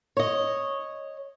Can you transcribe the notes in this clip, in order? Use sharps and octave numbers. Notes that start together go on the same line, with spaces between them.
C#5 D#5